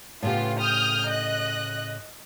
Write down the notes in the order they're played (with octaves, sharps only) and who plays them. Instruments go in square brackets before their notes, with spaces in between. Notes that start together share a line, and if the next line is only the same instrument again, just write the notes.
[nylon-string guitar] A2 C#3 G4 [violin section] B3 F4
[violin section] D#6 F6 G6
D#5 F#6